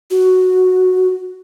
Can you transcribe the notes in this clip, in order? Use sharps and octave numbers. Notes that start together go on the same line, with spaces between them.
F#4